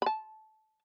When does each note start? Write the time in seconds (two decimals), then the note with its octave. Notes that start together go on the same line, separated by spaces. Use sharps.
0.02 A5 B5